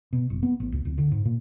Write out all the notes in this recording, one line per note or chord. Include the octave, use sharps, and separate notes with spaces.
B2
F#1
B3
A1
C#2
D1
D3
G#2
A#2